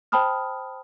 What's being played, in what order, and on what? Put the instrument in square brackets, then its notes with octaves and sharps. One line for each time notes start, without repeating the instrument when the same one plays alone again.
[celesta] C5 G5 A5 B5 D#6 F6